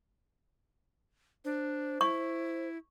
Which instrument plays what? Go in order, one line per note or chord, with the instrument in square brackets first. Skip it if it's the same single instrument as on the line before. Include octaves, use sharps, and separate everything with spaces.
[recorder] D4 [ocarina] C5
[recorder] E4 [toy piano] C#6